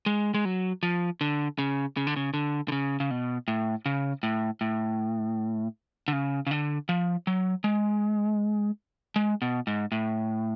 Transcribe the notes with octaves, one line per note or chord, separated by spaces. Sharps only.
G#3
G#3
F#3
F3
D3
C#3
C#3
D3
C#3
D3
D3
C#3
C#3
B2
A2
C#3
A2
A2
D3
C#3
C#3
D3
F3
F#3
G#3
G#3
B2
G#2
A2